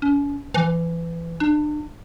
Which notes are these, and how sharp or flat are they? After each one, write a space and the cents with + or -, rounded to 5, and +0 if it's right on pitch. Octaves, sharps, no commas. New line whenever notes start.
C#4 +45
E3 +25
D4 +35